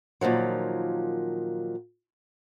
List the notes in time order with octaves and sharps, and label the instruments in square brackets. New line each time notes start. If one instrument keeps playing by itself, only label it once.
[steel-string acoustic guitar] A#2 D#3 F3 F#3